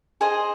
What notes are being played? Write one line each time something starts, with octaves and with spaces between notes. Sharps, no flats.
G#4 C5 D#5